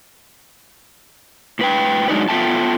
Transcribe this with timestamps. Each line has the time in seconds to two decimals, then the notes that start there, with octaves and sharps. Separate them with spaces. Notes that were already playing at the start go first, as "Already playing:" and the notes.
1.59 A2 B4 G5
2.08 F#3 G#3 D4 D#4 B4
2.29 B3 F4 A4 E5 G5 A5